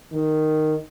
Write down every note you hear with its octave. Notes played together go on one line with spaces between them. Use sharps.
D#3